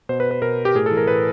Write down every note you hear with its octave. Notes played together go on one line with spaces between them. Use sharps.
B2 C5
B4
B4
B2 A#4
G4
A2 G#4
A4
E3
A#4
A2 B4